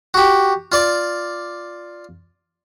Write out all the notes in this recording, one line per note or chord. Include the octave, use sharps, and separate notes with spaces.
F#4 G4
F4 D5 D6